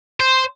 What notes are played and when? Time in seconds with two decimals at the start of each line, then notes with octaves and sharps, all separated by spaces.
0.20 C5